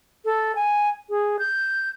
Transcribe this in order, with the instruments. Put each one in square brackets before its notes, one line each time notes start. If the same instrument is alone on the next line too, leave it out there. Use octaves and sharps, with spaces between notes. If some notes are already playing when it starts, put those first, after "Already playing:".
[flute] A4
G#5
G#4
G6